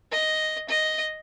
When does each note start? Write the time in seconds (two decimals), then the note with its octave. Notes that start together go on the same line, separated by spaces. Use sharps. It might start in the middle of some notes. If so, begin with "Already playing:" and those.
0.12 D#5
0.69 D#5